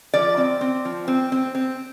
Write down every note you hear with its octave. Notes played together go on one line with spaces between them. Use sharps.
F3 D5
C4
C4
F3
C4
C4
C4